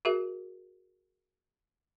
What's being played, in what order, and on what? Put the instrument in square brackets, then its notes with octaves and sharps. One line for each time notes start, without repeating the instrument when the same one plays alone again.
[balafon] F#4 G#4 A#4 E5